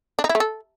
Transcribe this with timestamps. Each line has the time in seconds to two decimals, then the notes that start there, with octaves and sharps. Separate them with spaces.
0.19 D4
0.24 D#4
0.29 E4
0.35 A3
0.40 A4